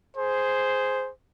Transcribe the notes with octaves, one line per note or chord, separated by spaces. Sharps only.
G#4 C5